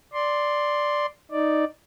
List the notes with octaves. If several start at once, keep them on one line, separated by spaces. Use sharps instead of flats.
D5 C6
D#4 D5